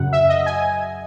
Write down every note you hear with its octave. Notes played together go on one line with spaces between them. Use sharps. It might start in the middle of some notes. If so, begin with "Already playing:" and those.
Already playing: F#2 C#3 F#3 F#5
E5
D#5
G#5